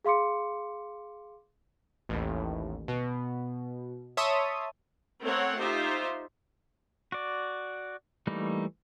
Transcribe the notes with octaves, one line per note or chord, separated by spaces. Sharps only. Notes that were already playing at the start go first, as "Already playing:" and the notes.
G#4 F5 C6 D6 C#7
A1 D#2
B2
C#5 E5 A5 C6 D#6
A3 C4 A#4 C5 C#5 F#5
D#4 F4 G4 C5 E5
F#4 D5
E3 G3 A3 A#3 D#4